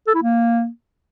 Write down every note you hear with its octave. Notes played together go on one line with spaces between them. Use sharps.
A4
E4
A#3